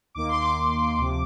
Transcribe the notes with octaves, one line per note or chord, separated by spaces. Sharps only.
D#2 D#3 A#3 D6
C6
D6
D2 C3 F3